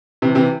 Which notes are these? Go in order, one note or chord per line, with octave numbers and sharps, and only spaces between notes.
C3 E3
C3 E3